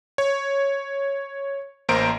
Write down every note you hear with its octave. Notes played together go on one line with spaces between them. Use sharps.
C#5
A1 A#3 C5 A#5 D7